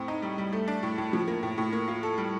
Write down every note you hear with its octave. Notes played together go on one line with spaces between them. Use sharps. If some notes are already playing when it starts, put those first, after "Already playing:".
Already playing: A2 C4
D#4
G3
G3
A3
D4
A2
A2
F3
A#3
A2
A2
A#3
F4
A4
G3